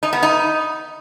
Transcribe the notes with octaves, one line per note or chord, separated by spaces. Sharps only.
D#4
B3
D#4